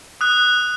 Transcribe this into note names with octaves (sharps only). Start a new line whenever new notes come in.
D#6 F#6